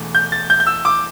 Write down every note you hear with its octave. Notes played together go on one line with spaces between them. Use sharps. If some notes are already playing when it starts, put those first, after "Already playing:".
Already playing: E1 E2 A3
G6
A6
G6
G6
E6
D6